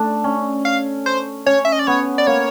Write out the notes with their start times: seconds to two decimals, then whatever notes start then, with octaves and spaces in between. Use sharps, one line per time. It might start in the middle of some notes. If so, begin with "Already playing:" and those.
Already playing: A3 D4
0.24 C#4
0.65 F5
1.06 C5
1.46 C#4 C#5
1.65 E5
1.72 D#5
1.79 D5
1.87 B3 C#5
2.18 D5
2.27 A#3 C#5